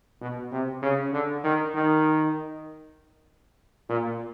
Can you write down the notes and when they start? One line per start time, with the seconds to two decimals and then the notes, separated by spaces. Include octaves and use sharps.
0.21 B2
0.52 C3
0.82 C#3
1.13 D3
1.44 D#3
1.75 D#3
3.89 A#2